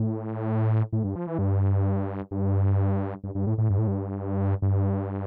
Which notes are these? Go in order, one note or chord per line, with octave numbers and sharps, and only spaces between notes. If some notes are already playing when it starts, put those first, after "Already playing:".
Already playing: A2
A2
G2
F3
E3
G2
G2
G2
G2
A2
A2
G2
A2
G2
G2